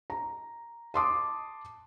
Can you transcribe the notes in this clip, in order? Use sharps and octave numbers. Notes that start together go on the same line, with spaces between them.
A#5
A5 C6 D6 D#6